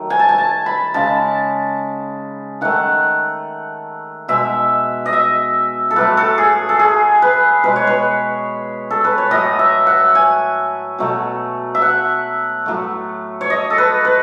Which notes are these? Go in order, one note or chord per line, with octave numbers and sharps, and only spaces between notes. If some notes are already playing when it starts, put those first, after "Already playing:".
Already playing: D#3 F#3 A3
G#5
A5
G#5
A5
B5
C#3 G#3 A5
D#3 A3 F#5
B2 G#3 E5
D#5
E5
A4
A2 F#3 A3 B4
A4
G#4
A4
G#4
B4
B2 G#3 B4
C#5
B4
A4
B4
C#5
A2 F#3 A3 D#5
E5
F#5
G#5
B2 F#3 A3
E5
F#5
A2 F#3 A3
C#5
D#5
A4
B4
B4